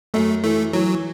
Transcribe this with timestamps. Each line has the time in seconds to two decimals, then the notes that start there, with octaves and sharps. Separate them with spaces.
0.14 F#2 A3
0.43 E3 A3
0.73 E3 F#3